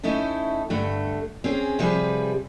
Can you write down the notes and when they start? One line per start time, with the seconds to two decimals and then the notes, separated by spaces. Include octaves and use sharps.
0.03 A3 C#4 D#4 E4 A4
0.70 G2 D3 A3
1.44 C4 C#4 G#4
1.79 C3 F3 G3 G#4 B4